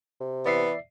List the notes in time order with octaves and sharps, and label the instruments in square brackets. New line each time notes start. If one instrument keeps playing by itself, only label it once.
[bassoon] C3
[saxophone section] E3 B3 [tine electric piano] D5 E5 C7